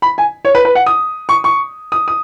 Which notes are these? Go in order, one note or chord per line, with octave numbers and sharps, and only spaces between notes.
B5
G#5
C#5
B4
B4
F#5
D#6
C#6
C#6
D#6
D#6